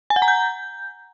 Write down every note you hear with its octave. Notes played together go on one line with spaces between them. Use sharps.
G#5
F#5
A#5
G6